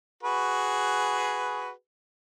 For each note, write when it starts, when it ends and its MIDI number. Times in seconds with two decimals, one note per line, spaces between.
0.23 1.70 66
0.23 1.70 68
0.23 1.70 71